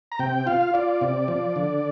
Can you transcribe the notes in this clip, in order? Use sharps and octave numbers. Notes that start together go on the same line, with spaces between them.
A#5
C3 G5
F4 F5
F4 D5
C3
F3
D3